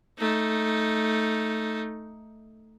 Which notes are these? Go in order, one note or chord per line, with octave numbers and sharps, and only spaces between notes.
A3 D#4